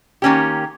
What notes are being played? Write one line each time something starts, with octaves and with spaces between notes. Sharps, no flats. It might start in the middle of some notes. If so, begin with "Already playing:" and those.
D#3 A#3 C#4 G4